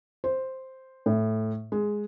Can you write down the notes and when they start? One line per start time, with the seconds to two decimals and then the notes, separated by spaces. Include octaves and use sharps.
0.24 C5
1.06 A2
1.72 G#3